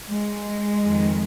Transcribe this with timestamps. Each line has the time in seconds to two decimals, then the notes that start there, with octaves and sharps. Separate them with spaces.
0.10 G#3
0.83 F2 D#3